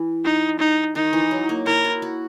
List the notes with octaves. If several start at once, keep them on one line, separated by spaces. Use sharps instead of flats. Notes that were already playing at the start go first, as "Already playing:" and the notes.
Already playing: E3
D#4
D#4
D#3 D#4
E3
F#3
A#3
E4 A#4
F#4
F#4